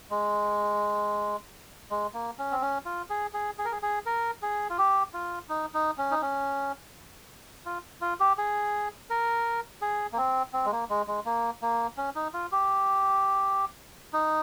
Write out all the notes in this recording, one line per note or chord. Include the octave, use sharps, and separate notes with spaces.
G#3
G#3
A#3
C#4
C4
C#4
F4
G#4
G#4
G#4
A#4
G#4
G#4
A#4
G#4
F4
G4
F4
D#4
D#4
C#4
D#4
C#4
F4
F4
G4
G#4
A#4
G#4
A#3
C4
C4
G#3
A#3
G#3
G#3
A#3
A#3
C#4
D#4
F4
G4
D#4